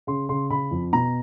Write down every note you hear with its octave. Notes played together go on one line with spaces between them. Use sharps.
C#3 C6
C#3 C6
C#3 B5
F2
B2 A#5